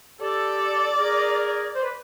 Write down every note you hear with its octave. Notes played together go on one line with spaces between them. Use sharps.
G4 A4 D5
G#4 A#4
C5
B4